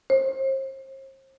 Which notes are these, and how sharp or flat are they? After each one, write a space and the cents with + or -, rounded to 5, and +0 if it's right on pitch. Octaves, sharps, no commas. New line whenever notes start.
C5 +40